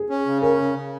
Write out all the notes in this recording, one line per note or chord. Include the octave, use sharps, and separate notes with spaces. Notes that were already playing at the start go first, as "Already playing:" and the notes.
Already playing: G#4
C#4
C#3
C#4 A#4
C#3
C#3